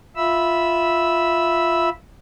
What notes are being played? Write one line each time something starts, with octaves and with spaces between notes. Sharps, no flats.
F4 E5 B5 E6